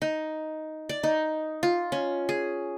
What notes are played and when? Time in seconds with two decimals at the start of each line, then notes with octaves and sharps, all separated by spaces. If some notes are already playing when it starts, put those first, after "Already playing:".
0.02 D#4
0.89 D5
1.03 D#4
1.63 F4
1.92 C#4
2.29 G#4